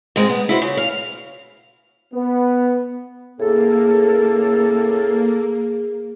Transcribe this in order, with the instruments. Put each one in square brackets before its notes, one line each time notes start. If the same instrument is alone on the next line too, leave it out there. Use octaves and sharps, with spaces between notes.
[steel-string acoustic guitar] G#2 G#3 C4
B3
E4 F#4 C5
C#3
F5
[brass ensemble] B3
[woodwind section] A2 C#3 A4 [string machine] A#3 [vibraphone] G#4